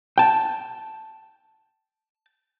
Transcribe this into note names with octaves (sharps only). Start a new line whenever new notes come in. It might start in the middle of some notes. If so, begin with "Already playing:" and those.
G5 A5